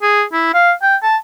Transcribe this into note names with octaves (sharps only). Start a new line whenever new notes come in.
G#4
E4
F5
G5
A5